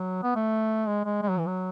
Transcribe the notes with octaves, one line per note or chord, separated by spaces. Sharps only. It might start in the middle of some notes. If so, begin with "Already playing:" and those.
Already playing: F#3
B3
A3
G#3
G#3
G#3
F#3
E3
F#3